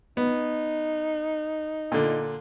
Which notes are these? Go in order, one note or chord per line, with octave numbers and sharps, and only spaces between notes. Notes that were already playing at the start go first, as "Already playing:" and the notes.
B3 D#4
A#2 D3